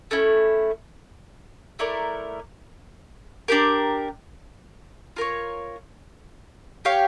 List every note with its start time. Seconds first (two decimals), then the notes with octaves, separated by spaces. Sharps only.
0.11 A3 C#4 E4
1.79 A3 E4 A#4 D5
3.48 D4 G4 A#4
5.16 F4 A#4 C#5
6.85 G4 C#5 F5